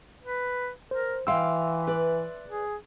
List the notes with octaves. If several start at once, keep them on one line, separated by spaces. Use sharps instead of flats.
B4
A#4 C5
E3 E5 F5 G5 C6 E6
B4 D5
G#4